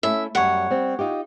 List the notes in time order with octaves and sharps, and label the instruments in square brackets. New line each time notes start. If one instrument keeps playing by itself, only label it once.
[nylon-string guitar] A3 C#4 E4 [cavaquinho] E5
[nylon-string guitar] F#2 G3 [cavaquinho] C#5 F#5
[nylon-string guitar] G3 C4
D#4 F4 G4